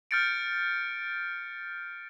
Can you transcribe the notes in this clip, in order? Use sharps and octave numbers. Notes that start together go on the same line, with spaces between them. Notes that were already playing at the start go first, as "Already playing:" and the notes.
F6 G6 A6 C#7 D7